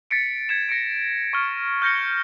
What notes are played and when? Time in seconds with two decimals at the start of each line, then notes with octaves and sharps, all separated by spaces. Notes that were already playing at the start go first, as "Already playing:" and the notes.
0.11 A6 B6 C#7 D7
0.49 G#6 B6 C#7 E7
0.69 A#6 C#7 D7
1.33 C#6 F6
1.82 F6 G6 A#6 C#7 G7